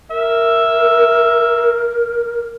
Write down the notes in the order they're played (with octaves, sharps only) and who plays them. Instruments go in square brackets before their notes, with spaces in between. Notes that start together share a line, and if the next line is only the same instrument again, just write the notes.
[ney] A#4 [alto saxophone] E5